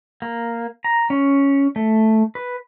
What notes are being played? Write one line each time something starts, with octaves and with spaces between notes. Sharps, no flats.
A#3
A#5
C#4
A3
B4